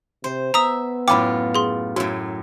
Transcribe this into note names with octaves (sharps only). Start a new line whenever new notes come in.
C3 C5
B3 E5 A#5 D#6
F#2 A2 F4 G5 B5 D6
G#4 C6
F#2 A2 F#4